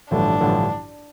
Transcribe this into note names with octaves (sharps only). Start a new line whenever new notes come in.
A1 G2 D3 F3 A3 D4
A1 G2 D3 F3 A3